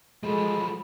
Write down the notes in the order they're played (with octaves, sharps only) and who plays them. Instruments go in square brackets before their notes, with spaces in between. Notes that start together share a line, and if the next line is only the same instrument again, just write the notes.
[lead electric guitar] F3 F#3 [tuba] G#3 [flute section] A4 B5